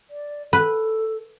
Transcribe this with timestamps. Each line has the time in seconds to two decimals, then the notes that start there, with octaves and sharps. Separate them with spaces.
0.10 D5
0.53 A4 B4